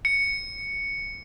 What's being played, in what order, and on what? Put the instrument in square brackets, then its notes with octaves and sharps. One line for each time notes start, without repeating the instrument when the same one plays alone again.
[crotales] C#7